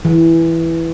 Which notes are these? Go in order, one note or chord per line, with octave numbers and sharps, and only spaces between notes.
E3